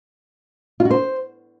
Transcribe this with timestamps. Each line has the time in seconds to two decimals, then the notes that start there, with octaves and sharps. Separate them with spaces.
0.80 F4
0.85 F#4
0.91 C5